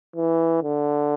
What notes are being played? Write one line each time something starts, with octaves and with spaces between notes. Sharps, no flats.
E3
D3